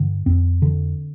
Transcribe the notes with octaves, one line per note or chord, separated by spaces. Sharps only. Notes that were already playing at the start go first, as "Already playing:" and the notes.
Already playing: G2 D3
F2 C4
D3